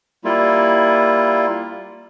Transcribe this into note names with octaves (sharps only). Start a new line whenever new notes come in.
G3 A#3 E4 F4